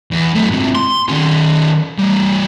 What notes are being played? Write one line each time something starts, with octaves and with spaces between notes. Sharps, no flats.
E2
F#3 A3
G#2 C3
C6
D#3 C#4
E3 G3